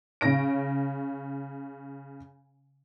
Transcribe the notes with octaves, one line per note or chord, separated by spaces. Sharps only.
C#3 C#5 A#6 D7